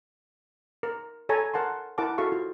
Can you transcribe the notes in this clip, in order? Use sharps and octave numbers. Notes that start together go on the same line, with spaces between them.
A#4
A4 C#5 G#5 A#5
A#4 F#5 A5 C6
E4 A#4 F#5 A5 D6
E4 F#4 G#4 A4 F5 C#6
F4